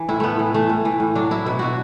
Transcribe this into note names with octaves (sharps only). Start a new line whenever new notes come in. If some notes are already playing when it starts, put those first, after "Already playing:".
Already playing: E3
A2 E4
A2 A3 B3
E3
E3 A3
A2
E3
A2
F#3 D4
F#3 E4
B2 E4
B2 F#4